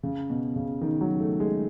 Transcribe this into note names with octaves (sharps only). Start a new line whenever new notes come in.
C#3
B2
C#3
D#3
F#3
A3
G#3